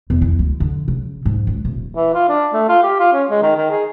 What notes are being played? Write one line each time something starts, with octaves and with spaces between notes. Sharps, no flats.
E2
E4
D2
D3
C#3
G#2
C#2
D#1
E3
F4
D4
A3
F4
G4
F4
C#4
G#3
D#3
D#3
G#4